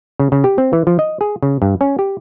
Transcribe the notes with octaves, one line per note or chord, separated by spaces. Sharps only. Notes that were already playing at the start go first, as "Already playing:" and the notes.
C#3
C#3
G4
C4
E3
F3
D#5
G#4
C#3
G2
C#4
G4